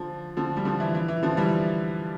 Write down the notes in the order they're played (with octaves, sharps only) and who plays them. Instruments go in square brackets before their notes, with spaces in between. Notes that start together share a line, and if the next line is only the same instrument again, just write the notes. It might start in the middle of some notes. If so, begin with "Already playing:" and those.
Already playing: [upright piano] D3 F3
D3 F3
G3
D3 F3
E3
E3
E3
D3 F3
E3 G3